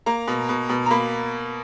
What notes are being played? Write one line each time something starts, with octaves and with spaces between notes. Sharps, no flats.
A#3 A#5
B2
B2
B2
A#5
A#3 B5